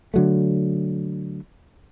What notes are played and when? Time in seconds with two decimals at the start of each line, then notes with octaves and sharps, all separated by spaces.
0.14 D3 F#3 A3